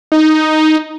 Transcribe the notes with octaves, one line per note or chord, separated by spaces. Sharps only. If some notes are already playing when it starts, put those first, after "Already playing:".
D#4